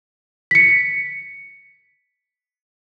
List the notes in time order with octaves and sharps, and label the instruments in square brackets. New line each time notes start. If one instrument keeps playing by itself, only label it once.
[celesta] B6 C#7